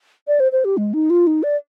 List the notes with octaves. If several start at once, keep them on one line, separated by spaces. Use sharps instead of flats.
D5
C5
C5
G4
G#3
D#4
F4
D#4
D5